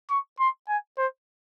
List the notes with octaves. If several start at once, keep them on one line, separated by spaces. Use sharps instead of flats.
C#6
C6
G#5
C5